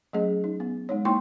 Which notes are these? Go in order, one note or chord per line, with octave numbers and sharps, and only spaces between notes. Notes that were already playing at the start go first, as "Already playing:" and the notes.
F#3 A3 C#4 G#4 D#5
D#4
B3
G#3 D#4 C#5
A#3 D#4 E4 G5 C6 C#6